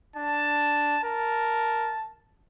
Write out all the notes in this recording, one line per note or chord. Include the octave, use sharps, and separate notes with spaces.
D4 A5
A#4 A5